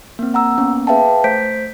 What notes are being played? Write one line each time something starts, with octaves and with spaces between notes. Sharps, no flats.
A#3 C4
F#5 A#5 E6
A#3 B3 C#4
G#4 B4 E5 F5 G5 A5
A3 C5 G6 B6 D7